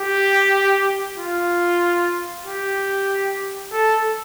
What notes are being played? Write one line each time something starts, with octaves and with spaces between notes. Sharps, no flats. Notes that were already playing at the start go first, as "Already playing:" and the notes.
Already playing: G4
F4
G4
A4